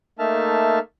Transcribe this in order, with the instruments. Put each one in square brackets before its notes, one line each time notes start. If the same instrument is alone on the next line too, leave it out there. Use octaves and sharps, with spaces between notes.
[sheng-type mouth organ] A3 A#3 D#4 E5 A5 F6